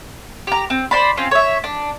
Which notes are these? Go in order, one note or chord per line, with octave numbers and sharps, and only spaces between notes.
G4 A#5
C4
C5 D5 B5
C4 C#4 F4
C#5 E5
D4